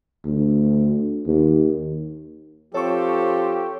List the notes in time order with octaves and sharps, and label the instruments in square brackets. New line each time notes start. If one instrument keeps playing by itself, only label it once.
[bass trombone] D2
D#2
[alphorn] F3 [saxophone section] C4 A4 [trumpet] G4 [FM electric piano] C#5 C#6